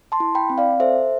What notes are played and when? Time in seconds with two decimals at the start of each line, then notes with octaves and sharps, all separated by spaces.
0.12 A5 C6
0.20 E4
0.35 G5 B5
0.50 C4
0.58 D5 F5
0.80 A4 C5 E5